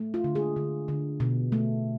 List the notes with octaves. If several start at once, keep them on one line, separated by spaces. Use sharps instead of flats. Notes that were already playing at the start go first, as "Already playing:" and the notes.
Already playing: A3
F4
D3
G#4
D3
D3
B2
A3